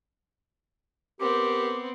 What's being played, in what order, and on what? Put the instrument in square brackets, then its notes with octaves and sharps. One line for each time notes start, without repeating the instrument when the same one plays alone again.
[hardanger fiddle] B3 C4 [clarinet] G4 [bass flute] A#4 [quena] D6